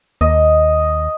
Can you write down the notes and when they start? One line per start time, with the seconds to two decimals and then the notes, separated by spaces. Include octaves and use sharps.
0.21 D#2 D#5